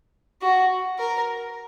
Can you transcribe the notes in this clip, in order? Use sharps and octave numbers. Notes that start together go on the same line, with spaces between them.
F#4
A#4